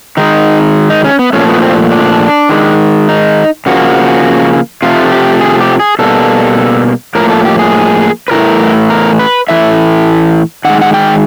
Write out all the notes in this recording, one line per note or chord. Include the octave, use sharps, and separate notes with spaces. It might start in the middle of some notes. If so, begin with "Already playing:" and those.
D#3 G#3 D#4
D#4
C#4
B3
A#2 F3 A3 C#4
B3
C4
D4
D#3 G#3
D#4
C#3 F3 A#3 F#4
C3 F3 A3 F4
G4
G#4
G4
G#4
B2 G3 A#3 A4
A2 F3 A#3 A#4
A4
G4
G#4
B4
A2 E3 A3 A#4
A#4
B4
A2 E3 A3 E5
D#3 G#3 F#5
F#5
G5